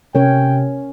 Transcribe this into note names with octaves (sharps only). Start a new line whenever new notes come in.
C3 C#4 A#4 C#5 G5